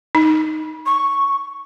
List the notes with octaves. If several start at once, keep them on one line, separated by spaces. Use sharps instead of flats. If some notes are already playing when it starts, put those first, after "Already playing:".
D#4
C#6